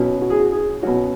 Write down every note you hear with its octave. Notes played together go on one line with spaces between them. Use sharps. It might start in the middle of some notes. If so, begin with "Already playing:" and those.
Already playing: B2 F#3 C#4
F#4
G#4
F#4
G#4
B2 F#3 C#4 F#4